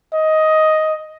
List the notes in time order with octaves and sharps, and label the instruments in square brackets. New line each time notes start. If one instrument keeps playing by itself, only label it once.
[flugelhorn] D#5